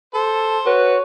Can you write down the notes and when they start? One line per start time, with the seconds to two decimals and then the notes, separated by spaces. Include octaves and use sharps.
0.14 A4 C5
0.66 F#4 B4 C#5